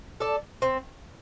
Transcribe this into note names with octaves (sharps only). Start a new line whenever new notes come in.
A4 D5
C4